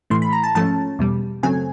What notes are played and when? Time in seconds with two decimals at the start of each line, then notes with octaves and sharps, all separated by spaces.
0.10 A2 E3 A3 C6
0.22 B5
0.33 A#5
0.44 A5
0.55 G#2 F3 A3 C#4 A5
0.99 E2 B2 G3
1.43 F#2 C#3 F#3 A3 C4 G#5